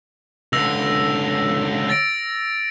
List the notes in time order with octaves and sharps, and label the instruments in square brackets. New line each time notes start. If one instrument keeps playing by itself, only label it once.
[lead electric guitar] C#2 D3 [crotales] E6 A#6 F7
[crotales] A6 A#6 D7